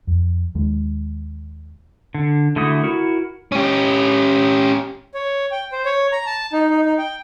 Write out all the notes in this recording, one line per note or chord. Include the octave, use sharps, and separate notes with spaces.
F2
D#2 D#3 G#3
D3
D3 A3 E4 F#4 D#6
E4 F#4 A#4
C#4 G4
C#5
G5
C5
C#5
A#5
A5
D#4
D#4
D#4
G5